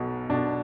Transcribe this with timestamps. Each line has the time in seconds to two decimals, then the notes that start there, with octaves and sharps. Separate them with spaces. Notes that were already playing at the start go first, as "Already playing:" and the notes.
Already playing: B1 B2
0.30 B2 D4